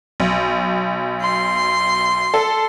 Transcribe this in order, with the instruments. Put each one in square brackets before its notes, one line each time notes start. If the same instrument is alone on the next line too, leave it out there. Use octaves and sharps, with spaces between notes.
[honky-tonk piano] B1
[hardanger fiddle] C6
[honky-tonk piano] A4